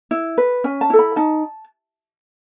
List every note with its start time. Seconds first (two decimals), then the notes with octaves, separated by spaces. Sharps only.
0.11 E4
0.38 B4
0.64 C#4 G#5
0.81 A5
0.90 E4 A4
0.99 B5
1.16 D#4 A5